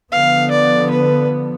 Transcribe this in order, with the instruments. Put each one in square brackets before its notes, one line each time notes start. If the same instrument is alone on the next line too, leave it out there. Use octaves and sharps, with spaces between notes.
[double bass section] D3 F3 B3 [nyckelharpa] F5
[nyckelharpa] D5
B4